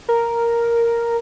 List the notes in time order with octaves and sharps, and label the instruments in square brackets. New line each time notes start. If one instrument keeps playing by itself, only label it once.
[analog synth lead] A#4